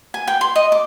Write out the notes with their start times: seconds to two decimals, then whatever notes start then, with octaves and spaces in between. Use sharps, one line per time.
0.14 G#5
0.28 G5
0.41 C6
0.56 D#5
0.72 D6